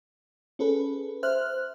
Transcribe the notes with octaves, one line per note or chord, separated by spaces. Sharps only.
C#4 G#4 A4 B4
C5 E5 F6 F#6